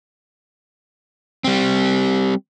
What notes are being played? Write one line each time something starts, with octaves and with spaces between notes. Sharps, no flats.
G3 C4